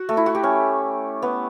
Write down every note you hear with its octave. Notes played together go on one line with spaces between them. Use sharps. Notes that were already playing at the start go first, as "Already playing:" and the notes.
Already playing: F#4
A3
E4
F#4
G4
C#4
B3